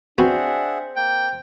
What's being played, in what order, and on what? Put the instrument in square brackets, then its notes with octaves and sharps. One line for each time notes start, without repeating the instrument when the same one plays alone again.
[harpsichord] B3 F#4 [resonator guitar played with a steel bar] C4 [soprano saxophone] D4 [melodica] G#4 E5 F#5
[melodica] A#3 [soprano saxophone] G5